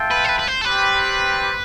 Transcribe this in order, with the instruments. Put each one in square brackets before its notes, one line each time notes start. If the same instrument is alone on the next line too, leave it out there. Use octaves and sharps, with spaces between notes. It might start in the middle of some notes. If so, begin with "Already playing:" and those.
Already playing: [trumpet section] F4 A4 E5 G5
[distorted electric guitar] B4
C5
B4
B4
C5
A4
[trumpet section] G3 C4 G4 [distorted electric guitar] B4